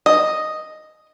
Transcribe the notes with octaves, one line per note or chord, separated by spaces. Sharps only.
D#5